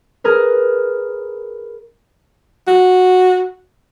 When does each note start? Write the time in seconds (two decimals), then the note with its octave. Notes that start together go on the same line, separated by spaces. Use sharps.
0.24 G#4 A#4 B4
2.67 F#4